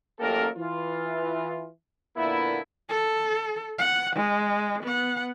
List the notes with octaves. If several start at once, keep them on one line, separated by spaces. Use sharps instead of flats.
A1 F#2 A#3 G4 A4 A#4
E3 F4
A#2 D3 A#3 B3 E4
A4
F#5
G#3
B3 F#5